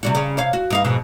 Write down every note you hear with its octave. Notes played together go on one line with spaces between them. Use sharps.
C3 G3 F#4
C#3
C3 C#5 F5
F#4
G2 D#4 F5
F2 G#2 B2